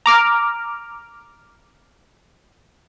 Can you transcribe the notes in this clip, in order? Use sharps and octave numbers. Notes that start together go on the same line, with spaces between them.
A#5 D6 F6